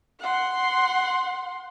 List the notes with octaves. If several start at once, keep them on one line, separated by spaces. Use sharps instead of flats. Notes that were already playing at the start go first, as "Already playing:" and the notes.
F#5 C6